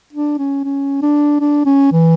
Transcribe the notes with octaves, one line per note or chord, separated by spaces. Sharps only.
D4
C#4
C#4
D4
D4
C#4
E3